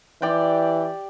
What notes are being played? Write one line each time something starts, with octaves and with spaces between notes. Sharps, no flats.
E3 G4 D5 G5